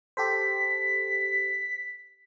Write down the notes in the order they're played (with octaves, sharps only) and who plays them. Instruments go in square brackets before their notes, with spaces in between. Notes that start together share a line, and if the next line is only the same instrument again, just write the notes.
[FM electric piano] G4 A4 C5 [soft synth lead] B6